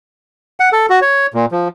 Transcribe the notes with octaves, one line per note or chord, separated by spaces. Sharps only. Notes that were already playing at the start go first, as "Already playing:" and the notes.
F#5
A4
F#4
C#5
A#2
F3